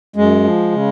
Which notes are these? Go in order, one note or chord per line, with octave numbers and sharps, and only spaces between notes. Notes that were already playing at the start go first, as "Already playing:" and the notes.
F#2 G#3
F3
C#3